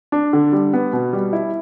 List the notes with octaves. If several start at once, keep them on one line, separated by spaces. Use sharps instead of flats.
D4
D3
G3
B3
B2
G3
E4